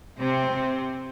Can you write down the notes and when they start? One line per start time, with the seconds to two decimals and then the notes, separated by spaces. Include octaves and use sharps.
0.19 C3 C4
0.53 C3